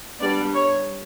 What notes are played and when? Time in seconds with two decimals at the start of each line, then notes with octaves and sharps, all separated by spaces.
0.20 G3 B3 D4 D5
0.54 C#5